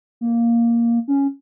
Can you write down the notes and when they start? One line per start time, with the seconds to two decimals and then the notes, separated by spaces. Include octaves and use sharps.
0.21 A#3
1.08 C#4